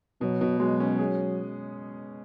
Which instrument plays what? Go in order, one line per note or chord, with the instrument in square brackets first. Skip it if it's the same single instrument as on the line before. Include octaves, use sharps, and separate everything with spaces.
[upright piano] B2 [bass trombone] F#3
[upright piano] B2
[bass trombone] F#3 [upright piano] G#3
[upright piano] C#4
G#4